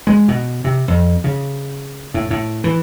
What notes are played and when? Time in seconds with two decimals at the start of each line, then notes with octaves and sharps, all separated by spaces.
0.07 G#3
0.28 B2
0.64 C3
0.88 F2
1.24 C#3
2.14 A2
2.30 A2
2.64 E3